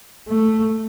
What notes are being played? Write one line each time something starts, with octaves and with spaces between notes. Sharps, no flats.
A3